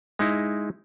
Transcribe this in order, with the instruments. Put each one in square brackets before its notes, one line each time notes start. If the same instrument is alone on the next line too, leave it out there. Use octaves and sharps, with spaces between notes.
[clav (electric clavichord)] G#3 D#4 E4